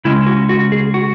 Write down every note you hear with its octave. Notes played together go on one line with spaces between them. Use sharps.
C#3 G#3 C#4 E4
F#4
F#4
G#4
F#4